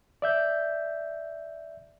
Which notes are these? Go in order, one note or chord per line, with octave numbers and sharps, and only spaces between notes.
D5 E5 G6